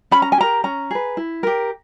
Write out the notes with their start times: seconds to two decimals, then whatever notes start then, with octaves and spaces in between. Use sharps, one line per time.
0.11 C#4 B5
0.22 A#5
0.32 G#5
0.38 G4 A#4 A#5
0.64 C#4 A#5
0.91 G#4 B4
1.17 E4
1.43 G4 A#4